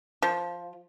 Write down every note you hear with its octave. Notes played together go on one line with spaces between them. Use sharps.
F3